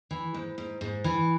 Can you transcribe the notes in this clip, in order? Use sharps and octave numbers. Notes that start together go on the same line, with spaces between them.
E3
G#2
G#2
G#2
E3